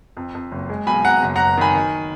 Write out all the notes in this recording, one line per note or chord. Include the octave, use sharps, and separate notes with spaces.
F2
F2
F#1
G#3
B1 G#5 B5
B1 F#5 A#5
F#1
F#1 F#5 A#5
D#3 G#5 B5
D#3